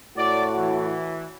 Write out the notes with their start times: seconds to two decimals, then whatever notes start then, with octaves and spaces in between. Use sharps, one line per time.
0.16 A2 F#4 D5
0.58 E3